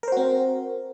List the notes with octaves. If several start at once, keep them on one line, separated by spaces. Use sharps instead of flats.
C4 F#4 A#4 C5